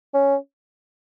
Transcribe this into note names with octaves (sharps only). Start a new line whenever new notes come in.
C#4